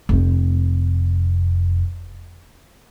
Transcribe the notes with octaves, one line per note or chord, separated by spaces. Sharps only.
F1 C4